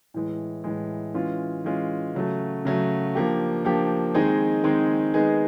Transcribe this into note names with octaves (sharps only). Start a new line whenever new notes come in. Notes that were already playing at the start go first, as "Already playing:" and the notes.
A2 E3 G#3
A2 E3 G#3
E3 G#3 C#4 F4
E3 G#3 C#4 F4
C#3 F#3 A3
C#3 F#3 A3
F3 A#3 D4 G4
F3 A#3 D4 G4
D#3 G#3 C4 D#4 G#4
D#3 G#3 C4 D#4 G#4
D#3 G#3 B3 D#4 G#4